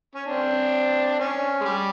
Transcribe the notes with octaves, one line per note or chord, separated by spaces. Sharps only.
C#4
C4 D4
C#4
G#3
G3